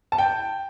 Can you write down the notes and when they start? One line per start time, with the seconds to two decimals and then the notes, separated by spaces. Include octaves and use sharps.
0.12 A5
0.18 G5